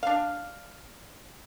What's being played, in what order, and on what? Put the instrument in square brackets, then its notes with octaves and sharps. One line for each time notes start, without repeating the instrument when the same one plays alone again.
[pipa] D4 F5